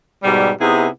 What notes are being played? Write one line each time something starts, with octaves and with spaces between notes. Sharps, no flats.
G#2 B2 G3
C3 B3 D#4 E4 G#4